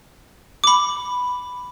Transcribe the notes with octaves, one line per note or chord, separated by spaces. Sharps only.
B5 D6